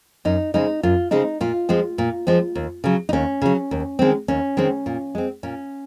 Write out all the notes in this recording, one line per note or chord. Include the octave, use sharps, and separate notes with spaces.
F#2 D#4
C#3 G#3 C4 D#4
F#2 F4
C#3 G#3 C4 D#4
A#2 F4
F3 G#3 C4
A#2
F3 G#3 C4
D#2
C#3 F#3
D#4
D#2 C#4
C#3 F#3
D#2
D#3 G#3 C4
D#2 C#4
D#3 G#3 C4
A#2
G#3 C4
A#2 C#4